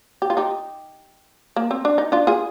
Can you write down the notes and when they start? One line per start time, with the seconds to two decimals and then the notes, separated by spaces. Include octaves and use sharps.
0.22 G4
0.30 F4
0.37 D#4 G4
1.56 A#3
1.71 C4
1.85 D4
1.98 D#4
2.12 D4 F4
2.27 F4 G#4